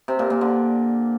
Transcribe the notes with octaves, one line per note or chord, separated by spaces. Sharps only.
C3
A#2
A#2
D3